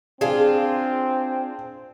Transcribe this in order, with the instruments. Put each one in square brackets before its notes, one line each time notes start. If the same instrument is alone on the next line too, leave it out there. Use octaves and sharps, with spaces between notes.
[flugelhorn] C4 [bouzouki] D4 F4 [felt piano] G#4